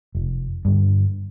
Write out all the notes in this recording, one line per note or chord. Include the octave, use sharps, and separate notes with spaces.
F1
G2 D3